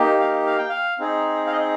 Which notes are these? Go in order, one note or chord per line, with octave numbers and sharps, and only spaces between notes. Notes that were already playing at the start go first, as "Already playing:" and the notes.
Already playing: A#3 D#4 G4
F5
F5
G5
F5
C4 D#4 G#4
F5
D#5